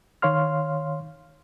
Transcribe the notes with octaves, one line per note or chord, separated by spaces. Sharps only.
D#3 C#5 F5 C6 F6